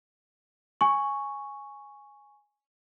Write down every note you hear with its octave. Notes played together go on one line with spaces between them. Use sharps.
G#5 C#6